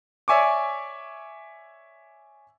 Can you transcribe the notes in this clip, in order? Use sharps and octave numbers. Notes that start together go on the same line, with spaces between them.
C#5 D5 E5 G#5 C#6 D6